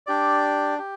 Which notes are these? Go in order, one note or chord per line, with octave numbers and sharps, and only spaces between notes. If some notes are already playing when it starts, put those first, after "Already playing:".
D4 G4 D5
G4